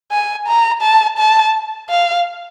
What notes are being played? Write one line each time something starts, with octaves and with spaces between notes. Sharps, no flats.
G#5
A#5
A5
A5
F5